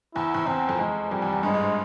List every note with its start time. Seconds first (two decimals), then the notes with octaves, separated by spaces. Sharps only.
0.15 E2 E4
0.34 E2
0.47 E2 C4
0.69 F2
0.79 E2 G#3
1.11 F2 G3
1.22 E2
1.33 E2
1.43 G2 G#3
1.54 G#2